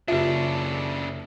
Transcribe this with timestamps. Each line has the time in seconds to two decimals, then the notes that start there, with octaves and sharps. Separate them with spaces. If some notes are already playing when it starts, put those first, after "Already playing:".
0.08 F#1 C#3 D4 F4 G4 E5